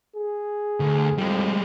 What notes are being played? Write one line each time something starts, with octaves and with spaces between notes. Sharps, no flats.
G#4
D2
F2 G3 G#3